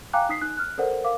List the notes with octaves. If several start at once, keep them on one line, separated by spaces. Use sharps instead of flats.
F5 G5 G#5 A#5 D6 F#6
D#4 D#6 B6 C7
D#4 F#6
F6 F#6
A4 A#4 C5 D5 F#5
A#4 F5 D6